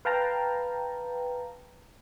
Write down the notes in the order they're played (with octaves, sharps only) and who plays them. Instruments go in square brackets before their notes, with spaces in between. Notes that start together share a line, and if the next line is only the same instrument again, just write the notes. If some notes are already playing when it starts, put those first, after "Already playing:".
[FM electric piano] B4 F5 G5 A5 A#5